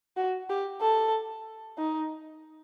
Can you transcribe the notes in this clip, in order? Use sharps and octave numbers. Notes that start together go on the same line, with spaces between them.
F#4
G4
A4
D#4